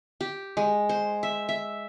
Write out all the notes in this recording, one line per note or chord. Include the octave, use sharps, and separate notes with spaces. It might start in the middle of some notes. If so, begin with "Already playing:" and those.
G4
G#3
C5
E5
E5